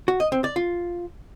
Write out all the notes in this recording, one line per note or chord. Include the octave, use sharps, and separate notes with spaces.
F#4
D#5
C4
D5
F4